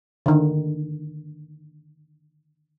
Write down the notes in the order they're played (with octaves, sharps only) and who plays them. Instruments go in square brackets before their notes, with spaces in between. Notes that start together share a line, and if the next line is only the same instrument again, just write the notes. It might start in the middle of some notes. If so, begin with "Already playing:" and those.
[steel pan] D3 D#3